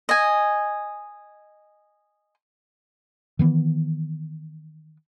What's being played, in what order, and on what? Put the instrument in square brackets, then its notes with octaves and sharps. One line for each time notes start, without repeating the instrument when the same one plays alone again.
[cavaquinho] D#5 G#5
[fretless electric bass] D#3 E3 B3